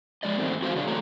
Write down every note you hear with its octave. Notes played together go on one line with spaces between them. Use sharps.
F2 G3 G#3 D5 D#5
G#2 D#3 A3 C4
F#4 C5 E5 F5
C#3 F#3 D4 D#4 G#4
E2 C3 A3 A4 C#5 A#5